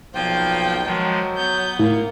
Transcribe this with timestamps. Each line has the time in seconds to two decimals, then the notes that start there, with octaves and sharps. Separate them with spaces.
0.14 B1 F3 A#3 F4 G5
0.86 D#3 F3 F#3 G#3
1.37 B3 G6
1.79 A2 A#3